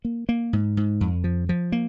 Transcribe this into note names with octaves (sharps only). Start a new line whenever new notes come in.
A#3
A#3
G#2
G#2
F2
F3
F3
A#3